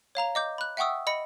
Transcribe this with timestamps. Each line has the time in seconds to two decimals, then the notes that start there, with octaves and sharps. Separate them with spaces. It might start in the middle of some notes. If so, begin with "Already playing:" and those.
0.15 C#5 F5 A#5 F7
0.35 D#5 D6 G6
0.58 B5 F#6
0.77 E5 F#5 G5 C#6 D#6 E6
1.07 D#5 B5 C#7